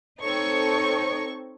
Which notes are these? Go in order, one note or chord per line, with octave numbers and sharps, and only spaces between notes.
C4 D#4 A4 C#5 C#6